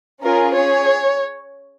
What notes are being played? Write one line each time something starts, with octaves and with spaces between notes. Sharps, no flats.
C#4 F4 G#4 A#4
C#4 G#4 C#5